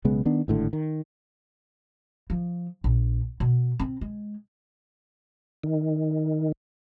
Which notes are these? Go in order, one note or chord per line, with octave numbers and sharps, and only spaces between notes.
B1 C#3 G#3 B3
D#3 B3 D4
G#1 A2 D3
D#3
F3
A#1
B2
C4
G#3
D#3